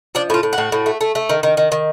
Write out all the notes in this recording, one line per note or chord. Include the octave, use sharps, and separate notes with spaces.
F3 D4
A2 F4
A2
F#4
A2
A2
A3
A3
A3
D#3
D#3
D#3
D#3